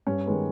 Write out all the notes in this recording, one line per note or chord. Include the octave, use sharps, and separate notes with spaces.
G2 C#4
D#3 G#3 B3